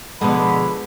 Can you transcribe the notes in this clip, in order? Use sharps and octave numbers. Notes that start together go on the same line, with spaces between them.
B2 D3 F3 G#3 B3 G#4 B5